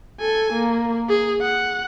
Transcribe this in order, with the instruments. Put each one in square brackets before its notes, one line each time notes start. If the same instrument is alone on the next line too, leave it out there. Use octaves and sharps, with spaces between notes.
[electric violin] A4 G#5
A#3
G#4
F#5